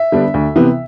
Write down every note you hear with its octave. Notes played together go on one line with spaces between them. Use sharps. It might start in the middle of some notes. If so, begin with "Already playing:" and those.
Already playing: E5
D3 G3 B3 D4
D2
C3 E3 B3